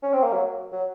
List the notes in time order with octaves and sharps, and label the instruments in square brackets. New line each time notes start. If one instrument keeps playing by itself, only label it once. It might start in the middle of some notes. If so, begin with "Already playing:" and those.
[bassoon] C#4
C4
A#3
F#3
F#3